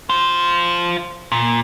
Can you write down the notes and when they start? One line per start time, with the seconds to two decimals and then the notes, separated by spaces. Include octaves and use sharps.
0.09 F4 C5
1.32 A#2